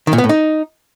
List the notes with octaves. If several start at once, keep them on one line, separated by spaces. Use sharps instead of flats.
D#3
A#2
B3
A2
D#4